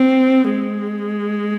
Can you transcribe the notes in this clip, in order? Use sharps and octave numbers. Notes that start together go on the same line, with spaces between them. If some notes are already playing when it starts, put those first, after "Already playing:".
Already playing: C4
G#3